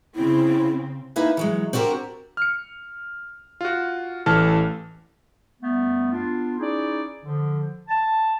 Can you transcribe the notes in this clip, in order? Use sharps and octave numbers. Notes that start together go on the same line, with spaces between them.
C#3 C4 E4
A#3 D#4 E4 B4 E5 G#5
E3 F#3 G#3
C4 D4 F#4 G4 A#4
F6 C#7
F4 F#4
A1 E3 A4 A5 F6
F#2 G3 A3 B3
B3 D4 F4
C#4 D#4 E4 G#4 D5
D3 F3
A5